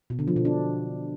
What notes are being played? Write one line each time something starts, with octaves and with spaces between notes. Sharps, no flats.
B2
D3
F3
B2
D4